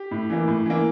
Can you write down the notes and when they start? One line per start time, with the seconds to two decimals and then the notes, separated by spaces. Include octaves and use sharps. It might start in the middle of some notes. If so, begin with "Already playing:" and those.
Already playing: G4
0.11 A2
0.30 E3 A#3
0.48 A2
0.66 E3 A#3